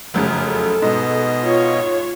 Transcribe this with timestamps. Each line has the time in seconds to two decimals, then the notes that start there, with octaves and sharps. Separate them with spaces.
0.14 F1 F#2 C#3
0.42 A4
0.82 G#2 B2 D#5
1.42 F4 C#5